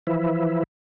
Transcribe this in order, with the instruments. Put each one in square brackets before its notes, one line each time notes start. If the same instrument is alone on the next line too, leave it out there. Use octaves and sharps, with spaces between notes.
[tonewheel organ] E3 F3 E4